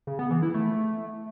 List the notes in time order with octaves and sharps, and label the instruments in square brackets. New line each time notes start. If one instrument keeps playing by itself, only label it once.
[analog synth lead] C#3
B3
E3
E4
A3